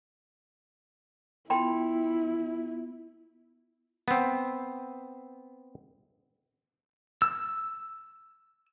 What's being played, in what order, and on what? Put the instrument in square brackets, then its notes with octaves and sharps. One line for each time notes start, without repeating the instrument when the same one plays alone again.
[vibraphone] B3 F4 [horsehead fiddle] E4 [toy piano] G5 B5 C6
[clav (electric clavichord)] B3 C4
[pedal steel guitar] E6